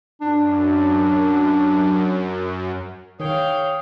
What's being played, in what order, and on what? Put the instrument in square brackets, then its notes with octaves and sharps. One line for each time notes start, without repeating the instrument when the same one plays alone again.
[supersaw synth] F#2 [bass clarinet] D4
[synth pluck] D#3 [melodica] G#4 [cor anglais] C#5 [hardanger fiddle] F5 G5